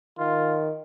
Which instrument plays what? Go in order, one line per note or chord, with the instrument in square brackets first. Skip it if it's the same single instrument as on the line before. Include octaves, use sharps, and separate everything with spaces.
[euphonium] D#3 [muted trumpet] F4